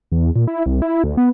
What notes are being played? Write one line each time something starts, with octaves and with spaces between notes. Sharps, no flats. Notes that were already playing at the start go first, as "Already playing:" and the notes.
E2
A#2
E4
C2
E4
D2
B3